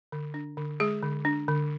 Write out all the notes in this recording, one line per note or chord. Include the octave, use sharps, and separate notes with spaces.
D3
D4
D3
G#3 G#4
D3
D4
D3